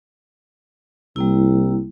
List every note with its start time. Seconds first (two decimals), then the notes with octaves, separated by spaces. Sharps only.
1.16 C2 G3 A#3 E4